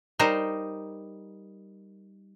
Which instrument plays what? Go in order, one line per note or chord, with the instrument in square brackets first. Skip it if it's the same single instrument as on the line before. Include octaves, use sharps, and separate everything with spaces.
[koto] G3 D#4 A#4 C5 A#5